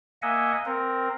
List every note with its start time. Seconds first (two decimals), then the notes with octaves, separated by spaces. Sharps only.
0.22 A#3 D#5 E5 F#5 G#5
0.65 C4 A#4